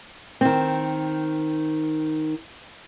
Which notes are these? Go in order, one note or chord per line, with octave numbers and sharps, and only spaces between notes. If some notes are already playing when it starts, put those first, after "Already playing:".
D#3 C4